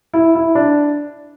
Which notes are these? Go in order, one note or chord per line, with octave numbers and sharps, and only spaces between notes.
E4
E4
D4